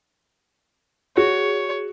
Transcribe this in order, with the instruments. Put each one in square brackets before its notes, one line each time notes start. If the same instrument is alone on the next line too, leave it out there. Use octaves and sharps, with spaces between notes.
[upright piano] F#4 [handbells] G#4 [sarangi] C#5